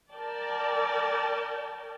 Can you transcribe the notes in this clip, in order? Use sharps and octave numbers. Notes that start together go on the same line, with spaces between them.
A#4 D5 G5 A5